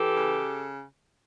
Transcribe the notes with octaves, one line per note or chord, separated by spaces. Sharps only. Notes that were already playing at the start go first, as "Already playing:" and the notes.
Already playing: E3 G4 A4
C#3